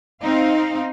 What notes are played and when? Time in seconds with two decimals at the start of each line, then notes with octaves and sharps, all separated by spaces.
0.21 C4 D#4 F5